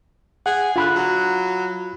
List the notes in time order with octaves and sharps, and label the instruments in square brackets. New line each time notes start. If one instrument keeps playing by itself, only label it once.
[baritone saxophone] G#4 [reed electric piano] F#5
[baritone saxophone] D3 [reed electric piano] F4 B5 F#6
[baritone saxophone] F#3